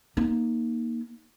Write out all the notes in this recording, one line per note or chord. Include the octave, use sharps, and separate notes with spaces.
A#3 D#4